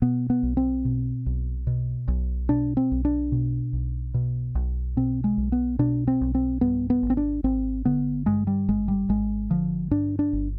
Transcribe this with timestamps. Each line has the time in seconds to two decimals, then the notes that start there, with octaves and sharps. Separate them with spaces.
0.02 B2 B3
0.30 B3
0.43 B1
0.57 C4
0.85 B2
1.26 B1
1.67 B2
2.08 B1
2.49 B2 D4
2.77 C4
2.91 B1
3.05 D4
3.32 B2
3.73 B1
4.14 B2
4.55 B1
4.97 B2 C4
5.24 G#3
5.38 B1
5.52 B3
5.79 B2 D4
6.07 C4
6.21 B1
6.35 C4
6.61 G2 B3
6.90 B3
7.02 G#1
7.10 C4
7.17 D4
7.44 G#1 C4
7.85 D3 B3
8.26 G2 G#3
8.47 G3
8.68 G#1 G#3
8.88 G3
9.09 G#1 G#3
9.50 D3 F3
9.91 G2 D4
10.19 D4
10.33 G1